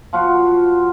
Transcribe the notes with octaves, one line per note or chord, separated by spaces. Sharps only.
F3 F4 F#4